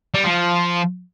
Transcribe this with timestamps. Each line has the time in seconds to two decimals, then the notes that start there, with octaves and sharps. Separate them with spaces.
0.14 G3
0.24 F3